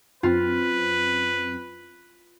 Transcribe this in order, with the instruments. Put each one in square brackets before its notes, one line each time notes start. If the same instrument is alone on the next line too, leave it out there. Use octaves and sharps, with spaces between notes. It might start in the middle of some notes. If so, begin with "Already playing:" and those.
[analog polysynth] F#2 C4 [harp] F4 [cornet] B4